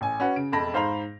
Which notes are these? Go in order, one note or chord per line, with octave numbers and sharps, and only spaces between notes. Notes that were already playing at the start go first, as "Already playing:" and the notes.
A1 G#5
C#4 F#4 B4 F#5
C#3 D7
E1 F2 A5 B5 A#6
G#2 C5 F5 A#5 B5 F7